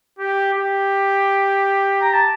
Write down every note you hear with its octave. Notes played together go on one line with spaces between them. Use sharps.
G4
G4
A#5
A5